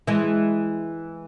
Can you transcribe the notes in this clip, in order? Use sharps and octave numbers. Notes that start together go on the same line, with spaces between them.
E3 G#3